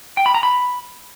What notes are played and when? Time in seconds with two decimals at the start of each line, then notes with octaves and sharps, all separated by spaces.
0.17 G5
0.26 B5
0.34 A#5
0.43 B5